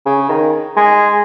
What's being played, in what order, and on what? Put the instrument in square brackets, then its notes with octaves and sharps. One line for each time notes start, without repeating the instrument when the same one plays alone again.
[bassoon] C#3
D#3
G#3